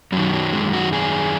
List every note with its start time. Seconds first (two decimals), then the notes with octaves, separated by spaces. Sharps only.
0.12 F#2 D#3 F#3
0.33 F#3
0.53 G#3
0.73 F#4
0.93 G#4